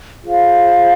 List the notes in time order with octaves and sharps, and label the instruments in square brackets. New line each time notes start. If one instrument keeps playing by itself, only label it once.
[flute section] F4 G#4 C5 F5